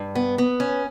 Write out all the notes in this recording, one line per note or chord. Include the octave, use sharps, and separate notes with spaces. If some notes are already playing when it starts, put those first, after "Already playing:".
Already playing: G2
B3
B3
C#4